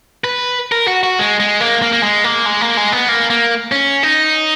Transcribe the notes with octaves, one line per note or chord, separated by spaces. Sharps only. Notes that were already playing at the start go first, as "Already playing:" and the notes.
B4
A#4
F#4
F#4
G#3
G#3
A#3
A#3
A#3
G#3
A#3
G#3
A#3
G#3
B3
A#3
A#3
C#4
D#4